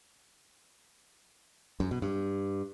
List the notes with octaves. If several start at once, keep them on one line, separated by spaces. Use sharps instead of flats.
F#2
B2
G2